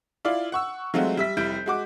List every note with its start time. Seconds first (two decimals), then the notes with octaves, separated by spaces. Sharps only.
0.25 E4 F4 D5 F5
0.52 F#5 C#6 E6
0.94 F#3 G#3 A3 C4 F4 F#4
1.17 G3 E5 B6
1.37 F1 G3 E4 G6 D7
1.66 G#3 F#4 D6